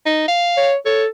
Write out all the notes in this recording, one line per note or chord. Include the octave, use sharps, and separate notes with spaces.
D#4
F5
C#5
A4 C#5